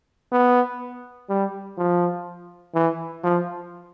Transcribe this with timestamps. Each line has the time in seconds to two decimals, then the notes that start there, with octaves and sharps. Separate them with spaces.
0.32 B3
1.30 G3
1.78 F3
2.75 E3
3.24 F3